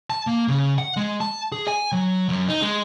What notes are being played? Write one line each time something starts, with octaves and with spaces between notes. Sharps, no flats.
A5
A#3
C#3
F#5
G#3
A5
G#4
G#5
F#3
F#2
D#4
G#3